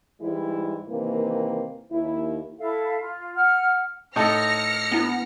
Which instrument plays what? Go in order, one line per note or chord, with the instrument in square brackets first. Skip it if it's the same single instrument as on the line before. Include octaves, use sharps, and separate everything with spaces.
[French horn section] G#2 E3 G3 G#3 E4
C3 D#3 E3 A#3
D#2 E4
[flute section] E4 A4 E5 F5
F4
F#5 F6
[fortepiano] A2 D#4 A4 [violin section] F6 A#6 C#7
[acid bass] B3 [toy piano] D4 E4